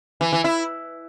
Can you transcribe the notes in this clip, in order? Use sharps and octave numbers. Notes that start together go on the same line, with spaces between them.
E3
E3
E4